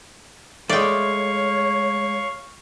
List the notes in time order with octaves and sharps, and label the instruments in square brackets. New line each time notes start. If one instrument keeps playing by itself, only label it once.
[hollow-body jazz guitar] G#3 A3 [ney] C#5 [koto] D5 G5 [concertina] F5 C#6